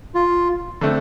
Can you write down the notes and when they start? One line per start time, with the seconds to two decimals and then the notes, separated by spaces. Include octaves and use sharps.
0.15 F4
0.81 D3 A3 C4